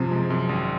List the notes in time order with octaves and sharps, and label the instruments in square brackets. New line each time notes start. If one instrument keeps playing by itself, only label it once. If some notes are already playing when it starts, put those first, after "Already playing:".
Already playing: [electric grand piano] F#2 F3 [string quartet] C3
[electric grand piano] G#3
F#2
G#1